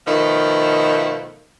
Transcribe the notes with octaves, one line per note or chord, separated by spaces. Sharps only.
B2 D#3 F3 A3